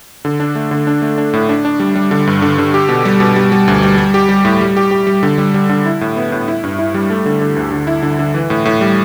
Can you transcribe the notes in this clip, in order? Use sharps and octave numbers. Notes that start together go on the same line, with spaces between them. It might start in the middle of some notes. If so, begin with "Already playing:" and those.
D3
D4
A3
D3
D4
A3
D4
A2
D4
D4
G3
G3
D3
G2
D3
D3
G4
B2
G3
B2
G3
G3
D2
G3
G3
G4
G3
A2
G3
G4
G4
G3
D3
G3
G3
D3
E4
A2
B3
A2
E4
G2
E4
G3
A3
D3
D3
D2
D3
E4
D3
D3
E3
A2
A2
G3